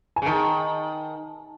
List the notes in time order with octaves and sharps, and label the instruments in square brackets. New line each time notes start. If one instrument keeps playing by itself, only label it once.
[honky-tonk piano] G#5
[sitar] C#3
[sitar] D#3 [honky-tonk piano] A5